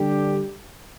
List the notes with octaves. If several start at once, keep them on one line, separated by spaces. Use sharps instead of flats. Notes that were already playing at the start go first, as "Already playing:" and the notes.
Already playing: D3 G3 D4 G4